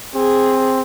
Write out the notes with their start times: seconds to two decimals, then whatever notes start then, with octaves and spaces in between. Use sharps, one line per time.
0.15 C4 G#4